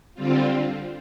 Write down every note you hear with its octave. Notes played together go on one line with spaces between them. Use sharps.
D3 G3 C4 F4